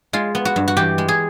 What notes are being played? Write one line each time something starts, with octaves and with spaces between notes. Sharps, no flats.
G#3 F4
B3
F#4
G2
F#4
E3 G4
G#3
G#4